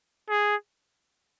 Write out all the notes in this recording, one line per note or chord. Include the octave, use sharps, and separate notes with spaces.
G#4